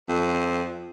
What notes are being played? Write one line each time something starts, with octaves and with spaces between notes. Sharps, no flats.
F2